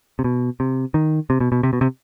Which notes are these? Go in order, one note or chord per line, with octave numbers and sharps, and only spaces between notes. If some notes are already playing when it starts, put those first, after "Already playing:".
C3
B2
C3
D#3
C3
B2
B2
C3
B2
C3